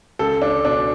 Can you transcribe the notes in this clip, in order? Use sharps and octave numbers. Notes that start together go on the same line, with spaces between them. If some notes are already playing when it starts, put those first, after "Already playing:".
C#2 A4
D4
B2 D4